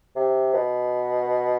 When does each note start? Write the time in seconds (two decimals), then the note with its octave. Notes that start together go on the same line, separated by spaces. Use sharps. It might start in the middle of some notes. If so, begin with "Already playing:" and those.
0.16 C3
0.54 B2